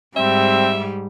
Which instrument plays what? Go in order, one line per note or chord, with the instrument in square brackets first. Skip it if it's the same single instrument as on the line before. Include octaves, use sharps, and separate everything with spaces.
[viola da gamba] G#2 G3 [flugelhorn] C4 [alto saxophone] E5